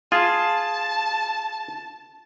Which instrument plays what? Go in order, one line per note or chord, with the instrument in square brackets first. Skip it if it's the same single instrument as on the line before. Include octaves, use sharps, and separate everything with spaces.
[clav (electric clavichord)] F4 G#4 [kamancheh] A5